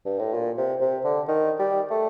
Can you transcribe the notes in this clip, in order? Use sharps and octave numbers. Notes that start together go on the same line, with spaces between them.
G2
A2
A#2
C3
C3
D3
D#3
G3
A3